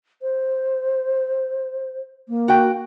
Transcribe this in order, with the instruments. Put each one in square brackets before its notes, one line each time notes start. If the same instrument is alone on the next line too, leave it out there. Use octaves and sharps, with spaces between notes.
[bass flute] C5
A#3
[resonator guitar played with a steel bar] F#4 G5